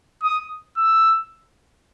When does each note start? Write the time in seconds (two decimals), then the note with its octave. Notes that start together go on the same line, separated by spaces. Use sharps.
0.22 D#6
0.77 E6